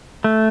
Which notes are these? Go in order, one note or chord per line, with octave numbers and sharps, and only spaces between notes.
A3